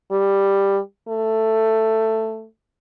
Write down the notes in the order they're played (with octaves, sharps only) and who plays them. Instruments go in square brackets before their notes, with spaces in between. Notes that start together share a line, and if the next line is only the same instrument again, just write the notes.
[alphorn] G3
A3